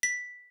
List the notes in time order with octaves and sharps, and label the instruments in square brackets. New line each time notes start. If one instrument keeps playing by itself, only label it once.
[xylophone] B6